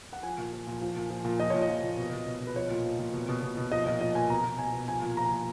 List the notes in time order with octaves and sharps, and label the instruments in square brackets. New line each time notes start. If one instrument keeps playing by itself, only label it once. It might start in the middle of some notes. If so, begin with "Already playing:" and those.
[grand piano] F#5
F3 G#5
A#2
F3
A#2
F3
A#2
F3
A#2
F3 D#5
A#2 C#5
D#5
F3
A#2
B2
B2
B2
B2
B4
F3 C#5
A#2
F3
A#2
B2
B2
B2
B2
F3 D#5
A#2 D#5
F3 D#5
A#2 G#5
B2 A#5
B2
B2 G#5
B2
F3 G#5
A#2
F3 A#5
A#2